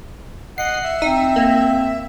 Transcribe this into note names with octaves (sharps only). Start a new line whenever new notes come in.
D#5 F#5 C7
E5
C4 D#4
A#3